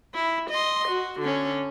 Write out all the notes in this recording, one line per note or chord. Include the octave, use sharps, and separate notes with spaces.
E4
D#5 C6
F#4
D3 C#4